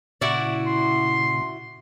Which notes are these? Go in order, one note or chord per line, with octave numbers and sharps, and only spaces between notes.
A#2 C#3 E4 F#4 D5
C6